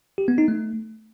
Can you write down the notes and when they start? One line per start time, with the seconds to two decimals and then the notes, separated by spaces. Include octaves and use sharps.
0.18 G4
0.28 B3
0.38 D#4
0.48 A3